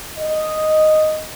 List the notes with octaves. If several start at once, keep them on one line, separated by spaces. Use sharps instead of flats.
D#5